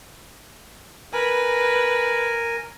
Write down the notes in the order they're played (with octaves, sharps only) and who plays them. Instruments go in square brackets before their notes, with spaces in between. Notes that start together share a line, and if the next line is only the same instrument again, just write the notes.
[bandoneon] A#4 G#5 [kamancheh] B4